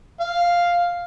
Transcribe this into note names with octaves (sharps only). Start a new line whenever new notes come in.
F5